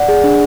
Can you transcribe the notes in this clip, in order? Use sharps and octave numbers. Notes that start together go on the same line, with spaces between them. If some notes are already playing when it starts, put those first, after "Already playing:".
Already playing: D5 F#5
G#4
D4